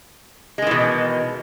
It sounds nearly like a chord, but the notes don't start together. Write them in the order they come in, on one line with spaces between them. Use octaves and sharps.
G#3 D#3 E3 B2